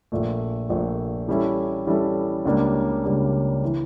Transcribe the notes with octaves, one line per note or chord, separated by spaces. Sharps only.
A#1 A#2 A3
A#1 A#2 A3
E3 G3 C#4 E4 A4
E3 G3 C#4 E4 A4
C#2 C#3 G3 A#3 D4
C#2 C#3 G3 A#3 D4
E3